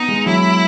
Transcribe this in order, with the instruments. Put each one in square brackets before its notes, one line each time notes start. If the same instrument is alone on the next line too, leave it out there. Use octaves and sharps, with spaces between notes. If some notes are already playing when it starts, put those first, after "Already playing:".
Already playing: [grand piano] B3 [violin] D#4
[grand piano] G#3
[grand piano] F#3 [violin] E4